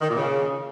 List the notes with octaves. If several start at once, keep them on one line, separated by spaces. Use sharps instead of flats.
D#3
A#2
C#3